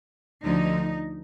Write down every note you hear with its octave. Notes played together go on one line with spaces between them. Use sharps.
D2 D3 F3 D#4